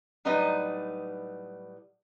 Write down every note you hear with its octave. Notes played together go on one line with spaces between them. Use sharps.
A2 F#3 G3 D#4 B4 D#5